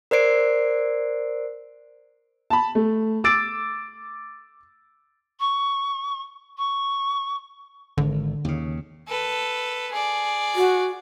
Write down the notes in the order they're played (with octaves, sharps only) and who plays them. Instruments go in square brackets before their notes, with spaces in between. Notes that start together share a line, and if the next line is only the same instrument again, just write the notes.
[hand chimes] A#4 C5 D5 C7 D7
[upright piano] A5 B5
A3
D6 E6 A6 D7
[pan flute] C#6
C#6
[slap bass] G#1 [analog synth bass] D3
[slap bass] D#2 C#3
[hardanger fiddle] A4 B4
G#4 D5
[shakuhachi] F#4